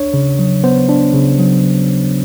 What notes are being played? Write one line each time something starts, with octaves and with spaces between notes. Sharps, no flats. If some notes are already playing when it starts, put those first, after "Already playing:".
Already playing: D4 C#5
C#3
F#3
B3 C5
D4
C#3
F#3